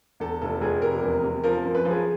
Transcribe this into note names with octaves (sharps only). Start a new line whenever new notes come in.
E2 A4
F1 A4
F1 G#4
C3 A#4
E2
C3
F3 A#4
F#2
B4
F3
G#4